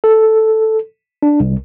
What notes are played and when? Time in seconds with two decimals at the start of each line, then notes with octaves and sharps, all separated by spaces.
0.04 A4
1.23 D4
1.40 C2